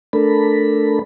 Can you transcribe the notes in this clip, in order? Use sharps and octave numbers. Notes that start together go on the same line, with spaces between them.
A3 D4 A4 A#4 B5